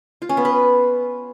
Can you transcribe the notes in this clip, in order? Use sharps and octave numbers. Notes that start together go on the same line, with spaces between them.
F4
C#4
B3
B4